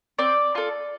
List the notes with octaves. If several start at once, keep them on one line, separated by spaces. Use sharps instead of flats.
C4 D5
F4 A4